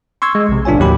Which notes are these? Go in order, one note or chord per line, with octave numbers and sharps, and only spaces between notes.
C6 C#6 E6 G#6
G#3
A#1 C3
A1 D4 F4 C#5 G#5
D#2 A2 F#3 G4 B5